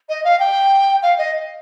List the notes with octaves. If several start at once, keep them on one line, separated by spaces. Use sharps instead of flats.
D#5
F5
G5
F5
D#5